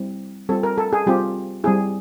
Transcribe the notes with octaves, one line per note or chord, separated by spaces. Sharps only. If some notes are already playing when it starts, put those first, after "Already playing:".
Already playing: G3 C4 E4
G3 C4 F4 A4
A#4
A4
G#4
G3 C4 F4 G4
G3 C4 E4 G#4